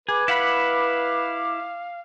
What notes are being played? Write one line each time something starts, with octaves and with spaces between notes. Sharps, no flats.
G#4 B4 D6
E4 F5 F#5 B5